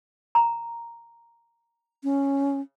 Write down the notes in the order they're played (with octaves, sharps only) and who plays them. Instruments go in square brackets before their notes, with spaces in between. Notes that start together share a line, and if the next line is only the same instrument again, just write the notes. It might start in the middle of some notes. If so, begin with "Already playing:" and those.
[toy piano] A#5
[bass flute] C#4